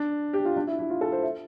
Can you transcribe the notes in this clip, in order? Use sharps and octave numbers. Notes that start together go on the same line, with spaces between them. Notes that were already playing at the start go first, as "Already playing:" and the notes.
Already playing: D4
G4
F4
D4
E4
E4
F4
A4
C5
E5